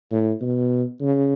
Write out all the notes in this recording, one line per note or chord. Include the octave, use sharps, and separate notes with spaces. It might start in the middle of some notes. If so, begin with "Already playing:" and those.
A2
B2
C#3